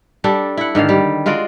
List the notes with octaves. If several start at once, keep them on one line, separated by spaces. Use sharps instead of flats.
G3 D4 A4
E4 F#5
G#2 D3 D#3 F5
G3
G#3 F4 F#4 D5